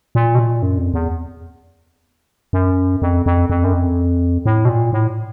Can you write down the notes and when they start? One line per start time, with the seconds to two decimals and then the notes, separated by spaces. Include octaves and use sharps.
0.15 A#2
0.35 B2
0.39 A#2
0.63 F#2
0.78 F2
0.94 E2
2.53 F#2
3.02 F2
3.26 F2
3.50 F2
3.64 F#2
3.73 F2
4.46 A2
4.65 B2
4.69 A#2
4.93 A2